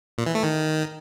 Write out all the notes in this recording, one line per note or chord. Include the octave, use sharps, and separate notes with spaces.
A#2
E3
A3
D#3